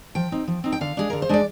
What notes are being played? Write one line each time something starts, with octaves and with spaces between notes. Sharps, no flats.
F3 G5
C4 D#4
F3
C4 D#4
G5
D3 F5
G#3 D4 G#4
D3 A#4
C5
G#3 D4 D5